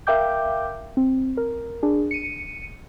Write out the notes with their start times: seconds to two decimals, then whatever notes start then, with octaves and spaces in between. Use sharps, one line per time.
0.07 A#4 E5 F5 G5 D6 G6
0.97 C4
1.37 A#4
1.83 D4 G#4
2.11 C#7 D#7